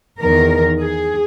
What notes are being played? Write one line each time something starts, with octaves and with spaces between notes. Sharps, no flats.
E2 D#3 A#4
G#4